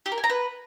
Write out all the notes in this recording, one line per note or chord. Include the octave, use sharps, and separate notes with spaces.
G4
A#4
G#5
A#5
B4